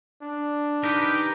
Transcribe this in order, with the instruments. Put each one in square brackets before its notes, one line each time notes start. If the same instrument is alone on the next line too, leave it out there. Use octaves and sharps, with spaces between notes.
[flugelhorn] D4
[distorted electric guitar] D#3 [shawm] G4 [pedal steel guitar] A#4 B4